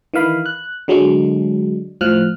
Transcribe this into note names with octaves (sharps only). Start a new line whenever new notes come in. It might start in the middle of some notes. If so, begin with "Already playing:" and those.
D#3 E3 F5 B5
F#6
D3 F#3 G#3 D4
A2 F3 F6 F#6